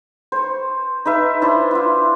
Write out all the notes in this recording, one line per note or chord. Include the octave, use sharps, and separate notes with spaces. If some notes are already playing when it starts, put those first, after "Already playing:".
C5 C#6
D#4 B4 E5
D4 E4 C5
E4 F4